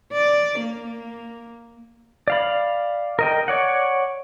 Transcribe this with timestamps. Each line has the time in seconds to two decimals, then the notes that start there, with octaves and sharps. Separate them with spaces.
0.13 D5
0.60 A#3
2.28 D5 F5 B5
3.19 A#4 D#5 G5
3.48 C#5 D5 F#5